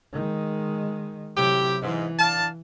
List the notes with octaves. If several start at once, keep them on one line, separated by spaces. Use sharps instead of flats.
D#3 G#3
A2 C3 F#3 E4 G4
G#2 E3
D4 F5 A5